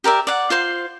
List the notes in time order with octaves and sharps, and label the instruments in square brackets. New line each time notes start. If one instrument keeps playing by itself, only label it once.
[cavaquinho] G4 A#4 D5 E5
D5 F#5
F4 C5 C6